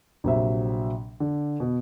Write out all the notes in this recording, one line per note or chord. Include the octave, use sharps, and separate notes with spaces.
A#1 C3 F#3 C4 E5
D3
B2